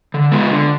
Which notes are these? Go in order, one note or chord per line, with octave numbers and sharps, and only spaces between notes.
D3
G#3 B3 F4 B4
D3